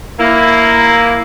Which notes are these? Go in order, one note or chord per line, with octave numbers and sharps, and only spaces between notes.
A#3 E4